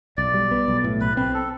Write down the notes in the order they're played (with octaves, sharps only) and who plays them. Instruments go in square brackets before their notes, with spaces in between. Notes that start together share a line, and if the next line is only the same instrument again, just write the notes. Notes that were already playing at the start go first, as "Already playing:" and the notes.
[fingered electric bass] B1 [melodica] D5
[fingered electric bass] G3
B3
B1
A2
[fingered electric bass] B1 [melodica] B4
[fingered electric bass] C4 [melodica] B4
[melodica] A4